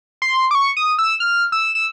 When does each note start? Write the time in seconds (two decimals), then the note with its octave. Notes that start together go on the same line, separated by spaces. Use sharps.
0.22 C6
0.51 D6
0.55 C#6
0.77 D#6
0.99 E6
1.20 F6
1.52 E6
1.75 E6